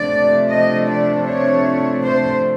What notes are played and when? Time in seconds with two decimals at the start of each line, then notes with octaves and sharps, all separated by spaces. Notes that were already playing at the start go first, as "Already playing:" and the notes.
Already playing: C3 F3 A3 D4 D5
0.49 D#5
0.87 D5
1.26 C#5
2.03 C5